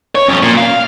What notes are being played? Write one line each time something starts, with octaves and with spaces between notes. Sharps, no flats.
C#5
F2 C#4
A#2
F5